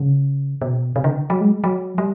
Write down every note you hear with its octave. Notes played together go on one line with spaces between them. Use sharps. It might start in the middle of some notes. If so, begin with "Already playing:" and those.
Already playing: C#3
B2
C3
D3
F#3
G#3
F#3
G3